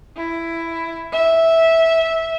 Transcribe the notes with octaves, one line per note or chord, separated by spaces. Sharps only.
E4
E5